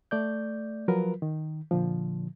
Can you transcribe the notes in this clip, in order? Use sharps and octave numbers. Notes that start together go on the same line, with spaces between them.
A3 D5 G6
F3 F#3 F4 A#4 B4
D#3
A#2 D3 F3